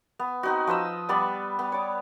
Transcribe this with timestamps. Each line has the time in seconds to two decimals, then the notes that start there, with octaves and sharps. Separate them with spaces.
0.19 B3
0.43 C4 D#4 F#4
0.67 F3 B4 D#5 E6
1.09 G3 B3 D5 C#6
1.59 B3
1.72 C#5 D6